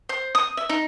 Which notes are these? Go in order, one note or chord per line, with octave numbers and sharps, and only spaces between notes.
C5
D#6
E5
D#4